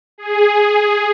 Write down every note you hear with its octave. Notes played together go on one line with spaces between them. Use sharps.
G#4